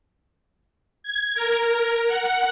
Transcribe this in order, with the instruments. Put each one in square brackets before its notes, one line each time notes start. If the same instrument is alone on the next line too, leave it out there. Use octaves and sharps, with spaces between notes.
[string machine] G#6
A#4
F#5